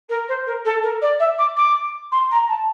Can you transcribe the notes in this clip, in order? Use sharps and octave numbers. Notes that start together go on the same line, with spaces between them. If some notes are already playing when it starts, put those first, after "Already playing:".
A#4
C5
A#4
A4
A#4
D5
E5
D6
D6
C6
A#5
A5